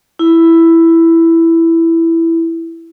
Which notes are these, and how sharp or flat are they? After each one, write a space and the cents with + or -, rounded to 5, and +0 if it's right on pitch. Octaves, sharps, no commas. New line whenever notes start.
E4 +5